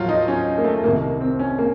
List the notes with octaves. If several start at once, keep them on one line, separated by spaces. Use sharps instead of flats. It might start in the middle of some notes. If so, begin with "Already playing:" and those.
Already playing: D#2 F3 F#3 F4
D#4
C#4
A#3
A3
C2 C3 D#3 A#3
C4
C#4
A#3